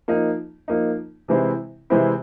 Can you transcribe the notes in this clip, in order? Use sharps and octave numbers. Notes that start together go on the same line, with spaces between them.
F3 A#3 D#4
F3 A#3 D#4
C3 E3 G#3 C4 E4
C3 E3 G#3 C4 E4